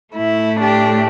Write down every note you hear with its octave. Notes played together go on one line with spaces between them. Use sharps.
A2 A3 E4
D4 G4